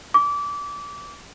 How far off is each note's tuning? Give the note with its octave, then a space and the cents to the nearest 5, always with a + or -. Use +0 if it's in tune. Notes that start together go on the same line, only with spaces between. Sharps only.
D6 -25